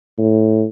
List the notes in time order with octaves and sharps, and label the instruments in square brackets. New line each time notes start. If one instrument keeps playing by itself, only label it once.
[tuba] A2